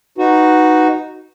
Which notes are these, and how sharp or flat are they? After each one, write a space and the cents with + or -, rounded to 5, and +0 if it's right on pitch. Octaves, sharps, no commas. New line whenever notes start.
D#4 +0 F#4 +0 B4 +0